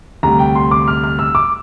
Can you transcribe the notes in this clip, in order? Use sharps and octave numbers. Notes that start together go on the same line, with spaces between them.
D2 C3 G3 A#5
G5
C6
D6
F6
F6
E6
D6